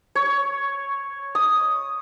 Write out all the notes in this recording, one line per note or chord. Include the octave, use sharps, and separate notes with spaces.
C#5
D#6